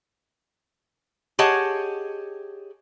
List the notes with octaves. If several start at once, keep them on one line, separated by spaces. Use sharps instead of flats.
G4 G#4 C#5 D#5 F#5 A5